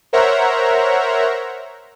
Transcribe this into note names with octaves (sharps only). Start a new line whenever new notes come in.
A#4 C5 C#5 E5 F#5 A#5